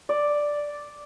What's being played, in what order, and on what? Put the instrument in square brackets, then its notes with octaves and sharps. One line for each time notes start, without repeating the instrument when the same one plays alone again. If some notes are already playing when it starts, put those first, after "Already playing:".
[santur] D5